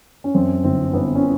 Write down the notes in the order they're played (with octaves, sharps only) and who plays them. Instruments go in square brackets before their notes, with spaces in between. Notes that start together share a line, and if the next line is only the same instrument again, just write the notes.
[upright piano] C#4
F#2 C4
G1 C4
G1 B3
C#4